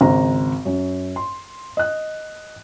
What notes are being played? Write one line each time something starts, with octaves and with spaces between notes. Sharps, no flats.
G#1 C#2 C5 A#5
F#2
C6
D#5 F#6